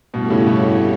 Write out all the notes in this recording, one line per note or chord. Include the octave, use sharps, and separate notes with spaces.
G2 B2 A3 E4 G4 C#5
A2 C#3
G2 B2